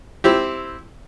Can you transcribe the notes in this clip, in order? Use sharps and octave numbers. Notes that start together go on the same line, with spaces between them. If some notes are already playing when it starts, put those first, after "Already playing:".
C4 E4 G4